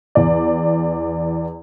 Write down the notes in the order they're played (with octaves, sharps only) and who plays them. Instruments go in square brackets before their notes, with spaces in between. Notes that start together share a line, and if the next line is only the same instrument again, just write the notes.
[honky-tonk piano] E2 D5